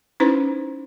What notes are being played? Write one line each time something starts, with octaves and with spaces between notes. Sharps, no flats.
C#4 D#4 E4 B4 C5